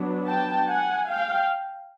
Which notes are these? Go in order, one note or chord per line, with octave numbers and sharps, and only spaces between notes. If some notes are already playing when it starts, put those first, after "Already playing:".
Already playing: F#3 B3 D4
G5 A5
F#5 G#5
F5 G5